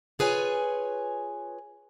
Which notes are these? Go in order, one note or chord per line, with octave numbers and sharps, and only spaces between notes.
F4 G#4 B4 C#5 G#5